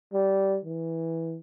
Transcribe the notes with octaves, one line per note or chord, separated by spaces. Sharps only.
G3
E3